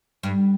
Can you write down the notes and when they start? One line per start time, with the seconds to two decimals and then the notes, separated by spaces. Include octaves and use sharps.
0.23 G2